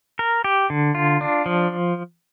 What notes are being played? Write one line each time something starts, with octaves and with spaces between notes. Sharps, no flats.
A#4
G4
D3
F4
D4
F3